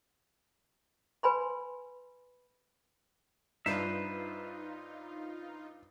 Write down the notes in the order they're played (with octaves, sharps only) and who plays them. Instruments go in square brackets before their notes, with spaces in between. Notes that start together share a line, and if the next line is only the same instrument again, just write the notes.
[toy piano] B4 G#5 B5 C6
[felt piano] G2 [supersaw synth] D#4 F4 [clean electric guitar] B4 C5 E5